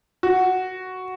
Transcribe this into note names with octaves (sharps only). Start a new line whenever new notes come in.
F#4